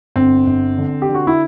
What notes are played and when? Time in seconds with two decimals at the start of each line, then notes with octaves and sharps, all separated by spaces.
0.16 G1 C4
0.47 G1
0.78 D3
1.02 G4
1.09 D3
1.15 F#4
1.27 E4